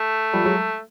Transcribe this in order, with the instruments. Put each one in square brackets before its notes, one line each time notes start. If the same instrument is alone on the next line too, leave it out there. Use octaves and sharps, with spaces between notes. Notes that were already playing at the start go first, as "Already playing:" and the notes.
Already playing: [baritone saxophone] A3
[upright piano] F3 G3
F#3 G#3